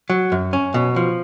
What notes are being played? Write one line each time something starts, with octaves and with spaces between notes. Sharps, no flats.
F#3
F#2
C#4
B2
F3